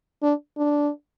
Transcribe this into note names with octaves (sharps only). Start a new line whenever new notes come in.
D4
D4